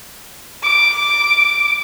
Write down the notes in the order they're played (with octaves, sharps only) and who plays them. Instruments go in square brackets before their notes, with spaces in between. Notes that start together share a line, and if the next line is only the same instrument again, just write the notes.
[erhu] D6